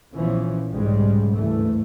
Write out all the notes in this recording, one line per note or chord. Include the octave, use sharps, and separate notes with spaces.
A#1 E3 F3 B3 C#4
B1 G#2 C#3 G3 G#3
F#1 D2 G2 E3 A3